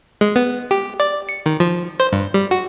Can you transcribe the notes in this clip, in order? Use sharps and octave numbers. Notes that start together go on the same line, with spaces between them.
G#3
B3
G4
D5
C#7
D#3
F3
C5
G2
G3
F#4